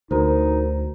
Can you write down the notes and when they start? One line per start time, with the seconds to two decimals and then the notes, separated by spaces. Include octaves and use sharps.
0.11 D2 D#4 F#4 A#4 C5